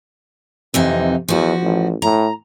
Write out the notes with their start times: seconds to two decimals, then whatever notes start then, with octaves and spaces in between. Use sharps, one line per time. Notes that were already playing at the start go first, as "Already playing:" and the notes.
0.74 F2 C3 E3 D#4
1.28 E2 F3 F#4
1.62 A1
2.02 A2 A#5